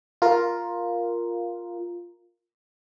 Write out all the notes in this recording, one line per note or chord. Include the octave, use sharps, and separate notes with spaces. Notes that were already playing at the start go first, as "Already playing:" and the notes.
F4 A#4